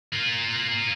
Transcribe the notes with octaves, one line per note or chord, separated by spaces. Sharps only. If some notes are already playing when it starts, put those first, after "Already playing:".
A#3 F4